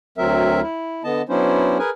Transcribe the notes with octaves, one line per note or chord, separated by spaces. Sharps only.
D2 F#3 C4 A#4 E5
E4
D3 B3 D#5 A5
F#3 B3 C#4 D4 E4 C5
G#4 A#4 B4 G#5